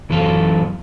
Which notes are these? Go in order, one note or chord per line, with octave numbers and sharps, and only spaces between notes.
F#2 E3 F#3 A4 F5